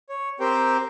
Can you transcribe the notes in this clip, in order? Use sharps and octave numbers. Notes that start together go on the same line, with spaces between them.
C#5
C4 G4 A#4 C5 G5